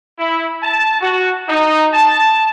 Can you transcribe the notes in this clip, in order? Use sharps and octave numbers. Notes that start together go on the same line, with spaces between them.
E4
A5
F#4
D#4
A5